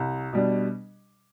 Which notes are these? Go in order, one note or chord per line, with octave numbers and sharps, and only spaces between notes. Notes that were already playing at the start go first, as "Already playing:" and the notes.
Already playing: C2
B2 G3 D4